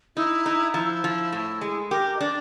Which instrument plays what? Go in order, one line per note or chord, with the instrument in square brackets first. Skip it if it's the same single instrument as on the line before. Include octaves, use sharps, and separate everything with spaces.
[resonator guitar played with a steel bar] D#4 [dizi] E4
[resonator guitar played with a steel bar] D#4
[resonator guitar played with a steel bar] F3 [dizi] E4
[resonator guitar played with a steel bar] F3
A2
G#3
[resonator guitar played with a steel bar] G4 [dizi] A#4
[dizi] D#5
[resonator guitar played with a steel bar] D4 [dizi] D5